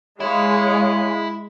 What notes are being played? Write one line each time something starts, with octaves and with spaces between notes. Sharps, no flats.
G#3 E4 C#5 F5